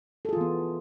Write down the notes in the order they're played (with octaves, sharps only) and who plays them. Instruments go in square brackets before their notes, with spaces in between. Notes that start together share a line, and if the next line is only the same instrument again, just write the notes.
[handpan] A4
G#4
F4
E3
B3